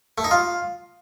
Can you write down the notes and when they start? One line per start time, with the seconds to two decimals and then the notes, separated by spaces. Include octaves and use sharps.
0.18 A3
0.24 D#4
0.31 F4